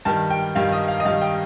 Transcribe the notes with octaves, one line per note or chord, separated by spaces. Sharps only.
G2 D#3 G3 A5
G5
G2 D#3 G3 F5
D#5
F5
D#5
G2 D#3 G3 F5
G5